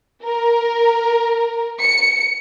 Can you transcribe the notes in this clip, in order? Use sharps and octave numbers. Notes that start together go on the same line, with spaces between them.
A#4
C#7